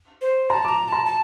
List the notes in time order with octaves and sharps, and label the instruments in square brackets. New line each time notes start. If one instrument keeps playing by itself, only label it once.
[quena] C5
[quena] A5 [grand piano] A#5
[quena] A#5 [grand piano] D6
[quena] A5 [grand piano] A#5
[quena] A5